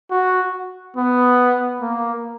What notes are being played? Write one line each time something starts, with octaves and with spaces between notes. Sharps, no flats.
F#4
B3
A#3